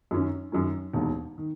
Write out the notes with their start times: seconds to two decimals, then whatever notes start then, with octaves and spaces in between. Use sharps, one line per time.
0.11 F#2 D#3 F#3 C#4
0.52 F#2 D#3 F#3 C#4
0.93 E1 D#2 D#3
1.38 D#3